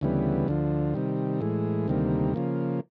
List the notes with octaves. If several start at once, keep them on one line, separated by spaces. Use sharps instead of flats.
D2 C#3 E3 G3 B3
D2 D3 F3
C3 D#3 G3
A2 E3 G#3
D2 C3 D#3 G3 A#3
C#3 F3 A#3